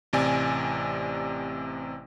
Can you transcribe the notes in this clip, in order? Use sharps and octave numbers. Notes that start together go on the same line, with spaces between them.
A1 C3 D5 G#5